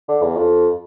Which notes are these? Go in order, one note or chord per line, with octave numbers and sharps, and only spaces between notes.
D3
E2
F2